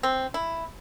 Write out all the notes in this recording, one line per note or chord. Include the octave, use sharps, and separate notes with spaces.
C4
E4